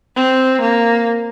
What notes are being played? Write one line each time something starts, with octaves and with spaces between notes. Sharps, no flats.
C4
A#3